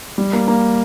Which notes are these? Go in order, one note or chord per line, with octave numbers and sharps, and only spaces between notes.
G3
A#3
A#3